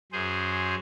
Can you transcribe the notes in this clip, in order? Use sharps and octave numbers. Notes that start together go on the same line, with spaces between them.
F#2 G#4 C5